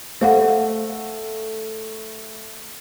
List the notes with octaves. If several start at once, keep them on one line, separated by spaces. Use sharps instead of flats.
A3 C5 F5 F#5